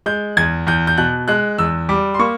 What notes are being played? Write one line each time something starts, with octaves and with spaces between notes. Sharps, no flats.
G#3 G6
E2 G#6
E2 G6
G6
B2 F#6
G#3 F#6
E2 E6
G3 D6
C6
A#3 C#6